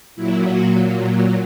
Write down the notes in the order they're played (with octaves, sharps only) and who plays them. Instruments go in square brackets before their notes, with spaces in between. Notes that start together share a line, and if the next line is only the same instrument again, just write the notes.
[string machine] A#2 F#3 E4
F#4